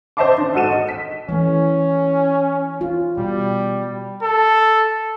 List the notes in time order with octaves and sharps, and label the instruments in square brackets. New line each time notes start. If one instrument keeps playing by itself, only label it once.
[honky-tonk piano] C5 D#5 E5 A5 C6 D6
D4
G#2 F#4 A4 D#7 E7
D#5
B6
[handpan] E3 A3 [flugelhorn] C#4
[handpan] F4
[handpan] B2 [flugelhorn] G3
[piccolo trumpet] A4